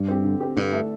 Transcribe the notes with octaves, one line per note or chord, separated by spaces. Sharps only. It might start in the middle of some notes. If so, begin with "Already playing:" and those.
Already playing: G2
C4 G4
D3
C4 G4
G2 D3
A3 D4 A4 E5